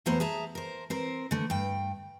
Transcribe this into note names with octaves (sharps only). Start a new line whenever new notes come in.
E2 F#3 A3 B3 C5 A#5
G#4 E5 A5 A#5
A#4 C5
C4 A#4 C5
D3 A3
G2 G5